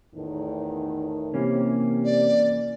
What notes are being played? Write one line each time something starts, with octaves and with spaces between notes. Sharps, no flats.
E2 A2 D#3
C3 E3 A#3 C#4
D5